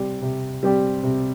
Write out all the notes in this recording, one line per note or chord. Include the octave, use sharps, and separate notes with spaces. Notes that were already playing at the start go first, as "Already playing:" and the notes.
Already playing: C3 G3 C4 G4 D5
C3
G3 C4 G4 D5
C3